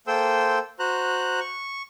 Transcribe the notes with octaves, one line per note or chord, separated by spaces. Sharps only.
A#3 A4 C5 G5 C6 E6
F#4 C5 A#5 F#6
C#6